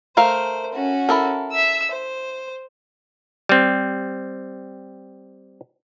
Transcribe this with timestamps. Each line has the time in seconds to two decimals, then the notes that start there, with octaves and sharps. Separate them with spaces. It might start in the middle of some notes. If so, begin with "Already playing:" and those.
0.17 A3 A#4 C5 F5
0.74 C#4 F#4
1.09 E4 A4 A#4
1.52 E5 E6
1.91 C5
3.49 G3 C4